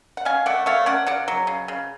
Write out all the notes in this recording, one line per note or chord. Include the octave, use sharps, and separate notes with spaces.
F#5
C#4 F5 G#5
A3 D5 F#5
A3 C#5 F5
C#4 D5 F#5
C#3 D5 F#5
F#3
C#3
C#3